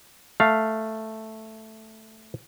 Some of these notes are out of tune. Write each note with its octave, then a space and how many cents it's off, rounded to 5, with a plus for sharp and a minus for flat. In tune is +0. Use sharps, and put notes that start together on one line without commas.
A3 +0 F5 +0